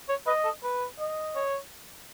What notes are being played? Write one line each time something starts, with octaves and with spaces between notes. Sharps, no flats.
C#5
B4 D#5
A4
B4
D#5
C#5